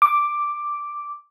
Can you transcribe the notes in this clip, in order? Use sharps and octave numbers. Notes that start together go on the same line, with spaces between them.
D6